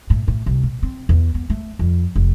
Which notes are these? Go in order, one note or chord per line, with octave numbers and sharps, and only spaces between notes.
A2
A2
C2
A#2
C4
E2
B3
A3
F2
F1